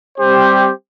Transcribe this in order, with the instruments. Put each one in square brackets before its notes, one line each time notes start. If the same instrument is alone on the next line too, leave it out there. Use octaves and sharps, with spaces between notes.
[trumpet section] G3 C4 G4 C5